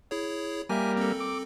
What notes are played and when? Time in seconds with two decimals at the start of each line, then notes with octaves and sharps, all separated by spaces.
0.11 E4 G#4 C#5
0.69 G3 A#3 E5 G#5
0.97 C4 A4
1.20 D6